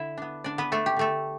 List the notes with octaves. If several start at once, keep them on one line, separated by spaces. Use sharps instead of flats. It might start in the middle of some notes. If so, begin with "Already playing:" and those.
Already playing: D3 E4 E5
B3 D4
D3 D4 D5
B3 B4
A3 B3 D4 A4
G4
D3 A3 A4